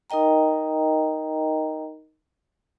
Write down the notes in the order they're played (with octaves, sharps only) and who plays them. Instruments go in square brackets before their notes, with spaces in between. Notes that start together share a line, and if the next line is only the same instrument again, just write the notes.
[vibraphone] D#4 A#4 D#5 G5 A#5